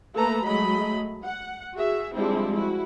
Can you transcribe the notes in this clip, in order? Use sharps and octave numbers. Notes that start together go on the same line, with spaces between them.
A3 A#3 A4 B4 A#5
F#3 G#3 A3 D#5 B5
F#5
F#4 G#4 E5
F3 G3 G#3 C4 D4 E4
E4 F#4